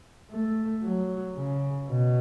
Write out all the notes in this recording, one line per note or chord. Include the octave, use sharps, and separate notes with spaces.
A3
F#3
C#3
B2